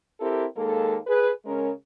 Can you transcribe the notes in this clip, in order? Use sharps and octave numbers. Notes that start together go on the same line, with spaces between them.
C4 E4 G4 A4 A#4
D#2 G#3 A#3 A4
G#4 B4
C#3 G#3 C#4 A#4